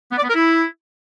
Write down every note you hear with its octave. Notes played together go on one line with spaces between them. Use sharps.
B3
D5
B3
A#4
E4